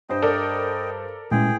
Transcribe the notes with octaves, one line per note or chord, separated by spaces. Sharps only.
G2 C5 D#5 G5
A4 A#4 D5
A1 A#2 G#3 C#4 G#4 G5